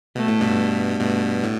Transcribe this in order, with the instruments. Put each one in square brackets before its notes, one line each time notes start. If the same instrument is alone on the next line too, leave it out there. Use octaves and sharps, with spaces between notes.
[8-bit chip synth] B2 [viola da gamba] A3
[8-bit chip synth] A2
G2 B2
[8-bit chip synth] G2 B2 [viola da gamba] A3
[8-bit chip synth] A2